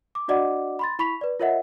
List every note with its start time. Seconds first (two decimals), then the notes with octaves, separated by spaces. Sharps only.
0.15 D6
0.28 D4 F#4 D5 D#5 F#5 D6
0.79 B5 C6 A6
0.99 E4 B5 C#6 B6 F7
1.21 B4 D5
1.40 F4 A#4 C#5 D#5 E5 F#5